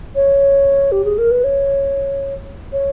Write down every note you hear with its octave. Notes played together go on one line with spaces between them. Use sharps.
C#5
G4
G#4
A#4
B4
C#5
C#5